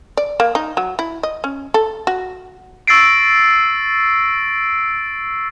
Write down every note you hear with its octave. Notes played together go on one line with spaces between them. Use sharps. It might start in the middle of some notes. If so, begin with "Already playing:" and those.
D5
A#3
D#4
F#3
E4
D#5
C#4
A4
F#4
C#6 E6 A6 A#6 C7 D7